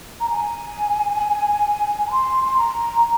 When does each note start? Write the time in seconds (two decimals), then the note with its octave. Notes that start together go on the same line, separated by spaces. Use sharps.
0.21 A#5
0.31 G#5
2.07 A#5
2.11 C6
2.44 C6
2.57 A#5